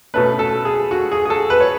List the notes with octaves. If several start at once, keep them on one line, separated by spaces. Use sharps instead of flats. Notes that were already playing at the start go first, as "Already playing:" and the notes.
B2 A3 C#4 B4
A4
G#4
F#4
G#4
G#4
A4
B4
C#5